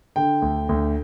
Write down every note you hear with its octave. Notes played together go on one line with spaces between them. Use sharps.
D3 G5
D2
D2